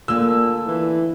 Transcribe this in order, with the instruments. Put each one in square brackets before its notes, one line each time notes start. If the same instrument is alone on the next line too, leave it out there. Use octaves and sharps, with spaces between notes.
[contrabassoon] A#2 [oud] D3 A#3 [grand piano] E6
[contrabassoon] E3